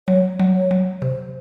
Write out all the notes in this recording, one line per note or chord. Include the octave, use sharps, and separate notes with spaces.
F#3 C#5
F#3
C#5
F#3
C3 C5